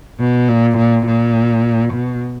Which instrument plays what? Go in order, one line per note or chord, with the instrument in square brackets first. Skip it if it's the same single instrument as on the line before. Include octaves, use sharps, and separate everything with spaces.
[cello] B2
A#2
A#2
A#2
B2